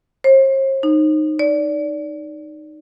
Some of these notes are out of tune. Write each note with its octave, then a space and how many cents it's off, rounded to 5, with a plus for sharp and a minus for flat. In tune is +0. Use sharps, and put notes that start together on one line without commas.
C5 +45
D#4 -15
D5 -20